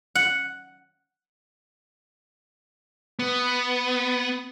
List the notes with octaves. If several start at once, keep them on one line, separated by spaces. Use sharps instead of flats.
F#5
B3